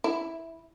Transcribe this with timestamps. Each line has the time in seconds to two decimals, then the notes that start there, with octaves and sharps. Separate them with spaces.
0.04 E4